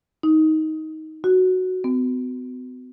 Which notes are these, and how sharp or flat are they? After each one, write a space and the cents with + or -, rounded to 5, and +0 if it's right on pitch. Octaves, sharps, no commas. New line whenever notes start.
D#4 +15
F#4 +0
B3 +40